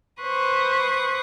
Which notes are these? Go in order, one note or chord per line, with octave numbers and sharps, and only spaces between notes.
B4 C5 C#6 D#6 F#6